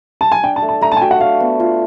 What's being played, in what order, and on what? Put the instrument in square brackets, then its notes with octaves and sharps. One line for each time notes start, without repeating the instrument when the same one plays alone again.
[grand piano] A5
G#5
[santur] D4 [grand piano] G5
[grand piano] A5
[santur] A3
[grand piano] A5
[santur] A3 [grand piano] A#5
[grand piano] A5
G#5
[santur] F#4 [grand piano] G5
[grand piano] F#5
[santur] D4 [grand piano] F5
[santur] B3
F4